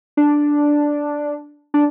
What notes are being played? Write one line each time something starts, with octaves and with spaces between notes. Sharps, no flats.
D4
D4